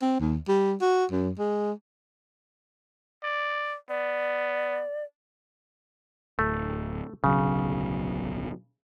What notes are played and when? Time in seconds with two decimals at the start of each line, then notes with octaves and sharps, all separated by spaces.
0.02 C4
0.20 D#2
0.48 G3
0.82 F#4
1.12 F#2
1.39 G#3
3.23 D5
3.89 B3 D5
6.39 D1 A3
7.24 D1 B1 C#3 F#3